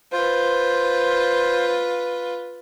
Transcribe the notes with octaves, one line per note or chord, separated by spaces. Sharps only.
F4 B4 C5